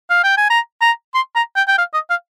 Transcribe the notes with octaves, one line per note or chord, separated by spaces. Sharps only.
F5
G5
G#5
A#5
A#5
C6
A#5
G5
G5
F5
D#5
F5